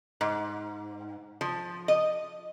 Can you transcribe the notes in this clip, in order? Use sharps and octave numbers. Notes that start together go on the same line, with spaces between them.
G#2
F3
D#5